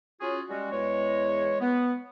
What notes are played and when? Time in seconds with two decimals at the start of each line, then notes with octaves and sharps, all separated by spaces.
0.21 C#4 F4 F#4 G#4
0.49 G3 G#3 C#4 F#4
0.71 E2 G#3 C#5
1.61 B3